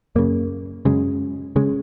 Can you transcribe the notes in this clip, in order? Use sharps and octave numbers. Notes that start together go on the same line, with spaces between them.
F#2 C#3 A#3
F#2 C#3 G#3
C#3 G#3